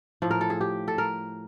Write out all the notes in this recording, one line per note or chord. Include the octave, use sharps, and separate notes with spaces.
A2 F3
A#4
A4
G#4
G4
A4
A#4